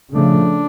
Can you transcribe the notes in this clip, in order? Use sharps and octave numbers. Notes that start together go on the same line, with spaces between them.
C#3 F3 A3 D4